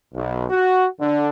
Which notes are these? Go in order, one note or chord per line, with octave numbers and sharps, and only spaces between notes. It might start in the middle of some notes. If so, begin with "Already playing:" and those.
B1
F#4
D3